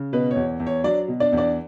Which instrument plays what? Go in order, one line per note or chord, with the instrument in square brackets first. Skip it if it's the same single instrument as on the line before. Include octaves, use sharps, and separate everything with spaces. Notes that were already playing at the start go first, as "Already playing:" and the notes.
Already playing: [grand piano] C#3
B2 B4
C#5
E2
E2
C#5
F#3 D4 D5
B2
D4 D5
E2
D4 D5